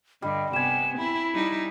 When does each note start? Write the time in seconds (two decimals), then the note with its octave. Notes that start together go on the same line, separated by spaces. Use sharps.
0.22 G2 D3 G3 D#5
0.53 C3 B3 G4 G#5 E7
0.98 C4 E4 B5
1.35 G3 D#4 E4